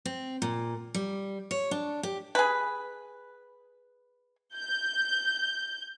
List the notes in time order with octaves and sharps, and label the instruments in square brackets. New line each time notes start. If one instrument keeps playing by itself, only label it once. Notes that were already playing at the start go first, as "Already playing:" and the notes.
[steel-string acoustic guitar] C4
A#2
G3
C#5
D4
G4
[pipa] G#4 B4
[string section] G6